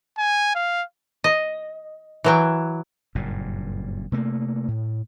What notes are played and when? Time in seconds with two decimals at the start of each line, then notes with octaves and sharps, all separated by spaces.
0.18 G#5
0.55 F5
1.24 D#5
2.24 E3 F#3 G5
3.15 F#1 G2 A#2
4.12 C3 A3 A#3
4.68 A2